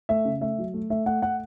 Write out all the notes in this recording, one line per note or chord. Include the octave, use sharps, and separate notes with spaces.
A3 E5
C#3
A3 E5
F#3
A3
A3 E5
A3 F#5
A3 F#5